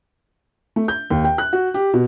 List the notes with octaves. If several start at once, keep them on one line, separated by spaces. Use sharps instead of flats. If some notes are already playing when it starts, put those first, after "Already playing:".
A3
G6
D#2
G5
F#6
F#4
G4
B2